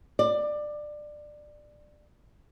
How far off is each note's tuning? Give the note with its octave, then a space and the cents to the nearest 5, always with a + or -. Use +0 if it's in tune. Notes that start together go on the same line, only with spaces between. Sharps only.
D5 +20